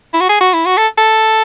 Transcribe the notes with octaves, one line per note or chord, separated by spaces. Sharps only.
E4
F#4
G#4
F#4
E4
F#4
A4
A4